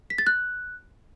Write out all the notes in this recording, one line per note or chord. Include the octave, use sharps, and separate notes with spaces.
B6
A6
F#6